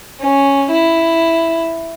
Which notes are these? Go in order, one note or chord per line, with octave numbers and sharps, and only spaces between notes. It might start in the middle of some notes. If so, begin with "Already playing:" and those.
C#4
E4